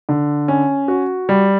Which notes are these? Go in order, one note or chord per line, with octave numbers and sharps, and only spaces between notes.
D3
C#4
F#4
G3